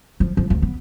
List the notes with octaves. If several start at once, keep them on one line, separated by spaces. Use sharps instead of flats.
F3
F3
D2
B3